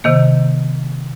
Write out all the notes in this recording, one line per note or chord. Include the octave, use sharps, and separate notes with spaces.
C3 D#3 A#3